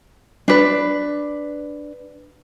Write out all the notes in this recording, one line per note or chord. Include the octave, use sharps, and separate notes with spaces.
D4 B4